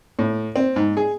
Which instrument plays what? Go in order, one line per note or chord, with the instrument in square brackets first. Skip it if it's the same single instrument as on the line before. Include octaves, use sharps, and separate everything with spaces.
[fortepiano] A2
C4
G#2
G#4